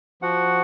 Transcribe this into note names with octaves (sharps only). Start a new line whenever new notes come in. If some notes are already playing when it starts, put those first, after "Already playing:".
F3 F#4 F#5